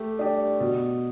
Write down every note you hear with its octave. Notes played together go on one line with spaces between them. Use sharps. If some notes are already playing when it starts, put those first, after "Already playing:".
Already playing: A3 G4
D4 G4
B2